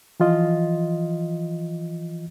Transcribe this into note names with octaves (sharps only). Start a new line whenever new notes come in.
E3 F3 F4 D#5